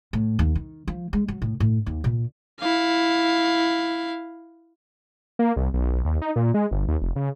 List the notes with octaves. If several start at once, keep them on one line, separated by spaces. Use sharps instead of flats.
A2
D#2
D#3
F3
G#3
F#3
A2
A2
D#2
A#2
E4 F5
A#3
C2
B1
B1
D#2
D#4
A#2
G#3
G1
D#2
F1
C#3